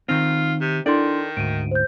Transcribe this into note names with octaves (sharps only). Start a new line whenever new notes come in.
D#3 C4 D#4 F4
C3
D#3 D4 E4 A4 D5 C6
D2 G#2 D7 D#7
C5 G6